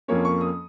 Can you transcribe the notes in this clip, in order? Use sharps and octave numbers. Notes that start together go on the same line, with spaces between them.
F2 F3 A#3 C#4 C#5
C#6
D#6